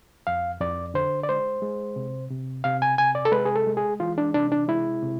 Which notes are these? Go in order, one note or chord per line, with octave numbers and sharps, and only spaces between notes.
F2 F5
F2 D5
D3 C5
D5
G#3 C5
G#3
C3
C3
C3 F5
G#5
C3 G#5
D5
A4
G#3 B4
G#4
A4
G#3
G#4
E3 F4
D4
C3 D4
D4
G#3 E4
C3